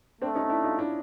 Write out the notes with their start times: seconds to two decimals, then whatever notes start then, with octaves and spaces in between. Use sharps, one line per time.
0.21 A3 C4 D4
0.35 C#4 D#4
0.50 D4 E4
0.64 D#4 F4
0.79 D4 E4